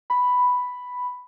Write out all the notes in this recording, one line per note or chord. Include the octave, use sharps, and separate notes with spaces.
B5